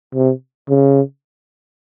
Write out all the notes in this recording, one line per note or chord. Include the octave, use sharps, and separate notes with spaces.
C3
C#3